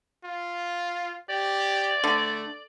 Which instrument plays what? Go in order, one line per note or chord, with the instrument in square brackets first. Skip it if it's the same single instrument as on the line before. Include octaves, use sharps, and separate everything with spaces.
[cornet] F4
[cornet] G4 [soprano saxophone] D5
[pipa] D3 [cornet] A3